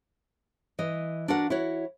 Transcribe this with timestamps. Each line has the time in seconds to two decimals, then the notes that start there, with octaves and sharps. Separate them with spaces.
0.79 E3 D#5
1.28 D4 F#4 A#4 F#5
1.50 E4 F#4 C#5